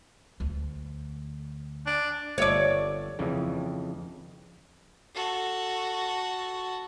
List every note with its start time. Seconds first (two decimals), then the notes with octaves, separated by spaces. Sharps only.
0.40 D2 A3
1.86 D4
2.38 G1 C#5 D5 E5 A5
3.19 F2 C#3 E3
5.14 F#4 A4